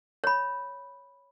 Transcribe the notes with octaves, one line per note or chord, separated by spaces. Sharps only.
C#5 B5